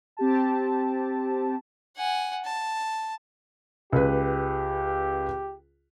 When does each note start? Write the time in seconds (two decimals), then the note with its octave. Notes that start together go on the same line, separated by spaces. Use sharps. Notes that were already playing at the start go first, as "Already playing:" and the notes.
0.17 C4 G4 A5
1.97 F#5 G#5
2.45 A5
3.92 C#2 G4 B4